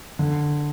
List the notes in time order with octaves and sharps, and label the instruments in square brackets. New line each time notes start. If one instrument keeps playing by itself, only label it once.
[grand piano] D3